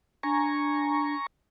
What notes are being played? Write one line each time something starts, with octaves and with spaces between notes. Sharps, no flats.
D4 G#5 A#5 C#6